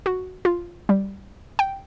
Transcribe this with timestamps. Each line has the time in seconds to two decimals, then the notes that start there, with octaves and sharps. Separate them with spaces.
0.06 F#4
0.45 F4
0.89 G3
1.59 G5